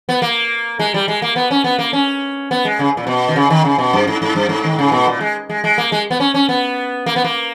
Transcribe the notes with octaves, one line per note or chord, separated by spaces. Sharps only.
B3
A#3
G#3
G3
G#3
A#3
B3
C#4
B3
A#3
C#4
B3
G#3
C#3
A#2
B2
D#3
C#3
D#3
C#3
B2
G2
G#2
G#2
G2
G#2
D#3
C#3
B2
A#2
G#3
G#3
G#3
A#3
G#3
B3
C#4
C#4
B3
A#3
B3
A#3